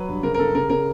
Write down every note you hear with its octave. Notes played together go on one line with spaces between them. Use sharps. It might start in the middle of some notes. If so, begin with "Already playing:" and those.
Already playing: F#3 B4
G2
C#3 A#4
A#4
C#3 A4
C#3 A#4
C#3 A#4